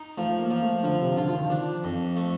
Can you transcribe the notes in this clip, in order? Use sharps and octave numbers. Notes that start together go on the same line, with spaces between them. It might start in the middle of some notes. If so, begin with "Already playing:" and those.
Already playing: D#4
F3 A3
A#3
F3
A3
D3 F3
C3
D3 F4
F3
D#3
F3 D4
F2
A3